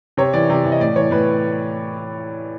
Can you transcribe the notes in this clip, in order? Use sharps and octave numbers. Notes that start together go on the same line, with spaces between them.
C3 C#5
E3 D5
C3
E3
D#5
A2 D5
E3 C#5
A2 B4